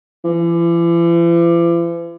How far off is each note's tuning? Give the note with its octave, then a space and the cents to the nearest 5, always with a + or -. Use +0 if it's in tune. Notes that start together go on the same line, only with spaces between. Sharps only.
E3 +45